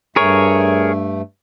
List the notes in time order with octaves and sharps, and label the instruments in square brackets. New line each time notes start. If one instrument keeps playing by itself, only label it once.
[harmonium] G2 A3 [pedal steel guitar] G#4 A#4 C#5